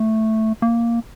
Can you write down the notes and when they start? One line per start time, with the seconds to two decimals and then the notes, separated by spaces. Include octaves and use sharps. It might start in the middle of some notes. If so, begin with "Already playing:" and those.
Already playing: A3
0.62 A#3